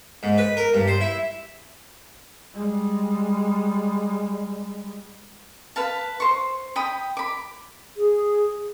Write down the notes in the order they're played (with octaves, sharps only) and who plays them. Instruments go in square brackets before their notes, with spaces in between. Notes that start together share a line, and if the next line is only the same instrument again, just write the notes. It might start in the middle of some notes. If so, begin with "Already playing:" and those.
[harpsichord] G#2
B4
A#4
G2
C5
E4
[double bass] G3 G#3
[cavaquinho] B4 F5 A5
C5 C#6
G5 B5 D#6
B5 D6
[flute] G#4